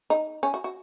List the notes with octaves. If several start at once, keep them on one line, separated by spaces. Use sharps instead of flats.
D#4
C#4
F#4
F#4